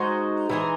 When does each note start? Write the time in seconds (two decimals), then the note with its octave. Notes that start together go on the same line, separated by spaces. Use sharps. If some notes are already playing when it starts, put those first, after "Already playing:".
Already playing: G#3 D#4 F#4 C5
0.49 E3 G#3 D#4 G#4